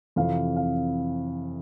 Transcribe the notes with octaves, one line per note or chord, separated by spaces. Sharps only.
F2 C3 E3 F5
F5